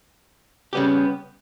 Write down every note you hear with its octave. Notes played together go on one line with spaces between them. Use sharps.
C#3 G3 B3 G4